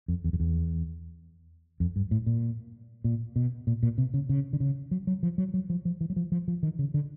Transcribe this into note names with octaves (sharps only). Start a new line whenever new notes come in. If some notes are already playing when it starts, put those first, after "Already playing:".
F2
E2
F2
E2
F2
G2
A2
A#2
A#2
B2
A#2
A#2
C3
C#3
C#3
D3
C#3
F#3
F#3
F3
F#3
F#3
F3
F3
E3
F#3
F3
F3
F3
D#3
C#3
D3